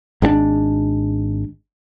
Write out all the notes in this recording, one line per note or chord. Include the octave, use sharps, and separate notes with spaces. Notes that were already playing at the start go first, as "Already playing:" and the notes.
G#1 G#3 C4 D4